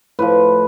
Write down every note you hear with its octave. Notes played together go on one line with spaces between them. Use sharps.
A2 F3 B4